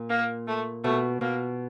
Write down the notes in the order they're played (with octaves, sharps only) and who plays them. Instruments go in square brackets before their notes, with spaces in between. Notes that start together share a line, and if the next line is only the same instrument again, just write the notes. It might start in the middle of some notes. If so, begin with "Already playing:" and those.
Already playing: [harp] A#2
[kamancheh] A#3
A3
[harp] B2 [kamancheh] A3
[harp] B2 [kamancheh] A#3